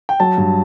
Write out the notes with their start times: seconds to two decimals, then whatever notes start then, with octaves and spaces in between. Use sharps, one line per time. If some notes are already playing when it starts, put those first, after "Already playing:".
0.09 G5
0.20 F#3 A5
0.38 G2